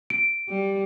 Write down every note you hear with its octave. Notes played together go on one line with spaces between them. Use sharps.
D7
G3